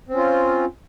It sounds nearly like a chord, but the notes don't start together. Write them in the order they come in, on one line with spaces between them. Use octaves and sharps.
C4 C#4 F4